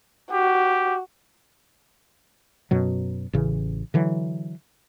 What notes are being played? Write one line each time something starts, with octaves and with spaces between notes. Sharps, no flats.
F#4 G4
F#2 B2 F#3
A1 C#3 E3
D3 E3 F#3